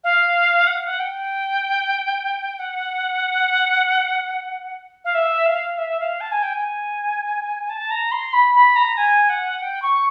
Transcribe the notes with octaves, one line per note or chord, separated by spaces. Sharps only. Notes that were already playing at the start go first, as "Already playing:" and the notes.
F5
F#5
F5
F#5
G5
F#5
F5
E5
F5
E5
F5
A5
G#5
G5
G#5
A5
A#5
C6
B5
B5
A#5
G#5
F#5
G5
C#6